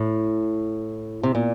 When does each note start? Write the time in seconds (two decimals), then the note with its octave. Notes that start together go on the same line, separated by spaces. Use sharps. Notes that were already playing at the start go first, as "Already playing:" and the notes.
Already playing: A2
1.23 C3
1.35 A#2